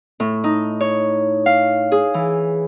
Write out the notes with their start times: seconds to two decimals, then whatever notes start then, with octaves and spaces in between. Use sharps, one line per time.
0.20 A2
0.44 D#4
0.81 C#5
1.46 F5
1.92 G#4
2.14 E3